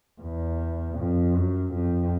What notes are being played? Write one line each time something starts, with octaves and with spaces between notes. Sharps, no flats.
E2
F2
F#2
F2